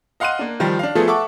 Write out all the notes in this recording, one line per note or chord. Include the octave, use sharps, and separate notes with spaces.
D#5 F5 F#5 C6 F#6 D#7
A#3 D4
D#3 F3 G3 F4
D4 F5
F3 A3 B3 F4 G#4 A4
A4 E5 F#5 C#6 D6